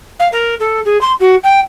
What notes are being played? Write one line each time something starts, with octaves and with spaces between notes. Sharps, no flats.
F5
A#4
A4
G#4
C6
F#4
G5